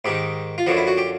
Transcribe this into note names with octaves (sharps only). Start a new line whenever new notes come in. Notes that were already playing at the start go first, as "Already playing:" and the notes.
G#2 D#3 G4
F4
F#2 D3 F3 F#4
E4
F#4
G4